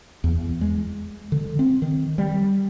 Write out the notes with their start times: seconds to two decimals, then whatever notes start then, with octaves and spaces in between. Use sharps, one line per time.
0.24 E2
0.61 G#3
1.32 D3
1.59 C4
1.82 D#3
2.18 G3